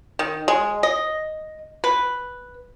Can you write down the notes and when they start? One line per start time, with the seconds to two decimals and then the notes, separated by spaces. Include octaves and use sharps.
0.19 D#3
0.48 G#3
0.83 D#5
1.84 B4